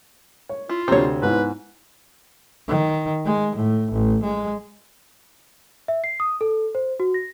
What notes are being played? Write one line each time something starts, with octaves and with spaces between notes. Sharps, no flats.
C#5
E4 F4
D2 C3 C4 C#5
G#2 B3 E4 B4
D#3
G#3
A2
A1
G#3
E5
C7
D#6
A4
C5
F#4
A#6